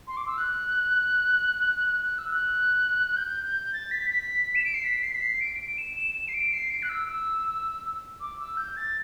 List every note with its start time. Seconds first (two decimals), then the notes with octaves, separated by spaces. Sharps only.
0.08 C6
0.17 D6
0.27 E6
0.38 F#6
2.04 F#6
2.18 E6
2.32 F#6
3.16 G6
3.73 A6
3.91 B6
4.10 B6
4.55 E7
4.64 D7
4.74 C7
4.84 B6
5.03 C7
5.15 B6
5.22 C7
5.41 D7
5.59 D7
5.78 E7
5.96 E7
6.15 E7
6.28 C7
6.34 D7
6.52 C7
6.70 D7
6.82 F#6
6.89 E6
7.08 E6
8.20 D6
8.39 E6
8.57 G6
8.77 A6